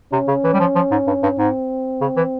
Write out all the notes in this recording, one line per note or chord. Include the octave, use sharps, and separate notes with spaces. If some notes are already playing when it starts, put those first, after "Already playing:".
C3 C#4
C#3
E3
G3
F3
F3
G#2
G2
G2
G#2 C4
C#3
E3